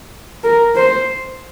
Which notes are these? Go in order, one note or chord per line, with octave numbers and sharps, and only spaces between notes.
A#4
C5